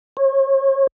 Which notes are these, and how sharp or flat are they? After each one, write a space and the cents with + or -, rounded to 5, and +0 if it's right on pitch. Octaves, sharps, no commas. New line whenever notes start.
C#5 -35